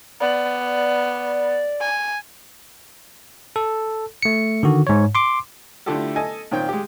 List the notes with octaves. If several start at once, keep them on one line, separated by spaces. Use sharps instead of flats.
B3 D5
G#5
A4
A3 C#7
D3 D#3 F#4
G#2 C#5
C6 D6
D3 A3 E4 F4 G4 A4
A4 D#5 G#5
A#2 D#3 C4 C#5 G5
G#3 G4